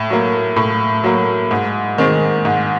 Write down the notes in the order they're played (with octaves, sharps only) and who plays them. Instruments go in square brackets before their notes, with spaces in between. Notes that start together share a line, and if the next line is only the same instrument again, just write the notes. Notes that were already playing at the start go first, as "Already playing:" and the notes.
Already playing: [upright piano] A2
F#3 A#3
A2
F#3 A#3
G#2
D#3 G#3 C4
G#2